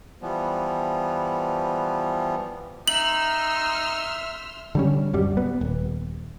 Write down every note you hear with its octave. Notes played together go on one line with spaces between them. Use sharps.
E3 F3 G3 B3
D#4 E5 C6 E6 F6 F#7
D3 G3 C#4
D1 F#2 G3
B3
D#1